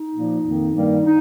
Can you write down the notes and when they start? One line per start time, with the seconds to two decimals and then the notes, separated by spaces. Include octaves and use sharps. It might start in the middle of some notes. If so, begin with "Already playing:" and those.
Already playing: D#4
0.14 A#2 F3 A#3
0.44 F2 D#3 A#3
0.75 G2 D#3 G3 A#3
1.05 D#4